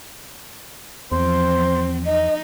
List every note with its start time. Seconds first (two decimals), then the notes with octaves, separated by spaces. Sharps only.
1.12 E2 F3 C4 C5
2.06 D#4 D#5